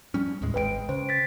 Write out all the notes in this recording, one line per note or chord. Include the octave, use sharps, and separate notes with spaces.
F3 G3 C#4
D#2 A2 G#3
G#1 C#3 G#3 B4 G5 D7
C#3 C5
A6 B6